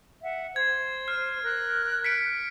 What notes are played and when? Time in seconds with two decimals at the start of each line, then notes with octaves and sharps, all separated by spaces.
0.21 E5 F#5
0.56 C5 G#6
1.08 F6
1.43 A#4 F#6
2.04 B6 C#7 D7